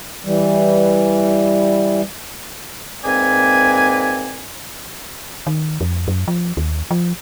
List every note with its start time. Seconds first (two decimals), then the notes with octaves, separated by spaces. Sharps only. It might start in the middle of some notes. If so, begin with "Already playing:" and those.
0.25 E3 G3
3.04 G#2 A#3 C4 B4 D5 G#5
5.47 D#3
5.81 F2
6.08 F#2
6.28 F3
6.57 D#2
6.91 F3